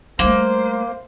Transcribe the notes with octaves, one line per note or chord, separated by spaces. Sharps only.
G3 A3 A#3 C5